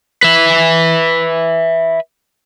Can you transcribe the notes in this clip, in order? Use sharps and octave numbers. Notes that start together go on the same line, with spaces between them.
B4 E5